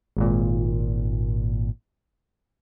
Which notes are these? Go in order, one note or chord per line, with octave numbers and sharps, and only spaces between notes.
G#1 A#2